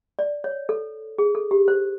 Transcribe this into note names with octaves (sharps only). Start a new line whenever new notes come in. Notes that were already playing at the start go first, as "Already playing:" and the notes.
D5
C#5
A4
G#4
A4
G4
C5